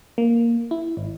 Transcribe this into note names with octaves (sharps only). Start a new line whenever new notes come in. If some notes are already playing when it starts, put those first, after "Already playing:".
A#3
E4
G#1